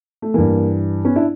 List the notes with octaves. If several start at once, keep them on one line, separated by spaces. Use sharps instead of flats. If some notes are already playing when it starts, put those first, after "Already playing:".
A3
G2 E3 A#3
B3 C#4
D4 E4